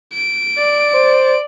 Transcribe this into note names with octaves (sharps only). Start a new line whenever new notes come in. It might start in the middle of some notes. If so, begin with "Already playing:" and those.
D7
D5
C5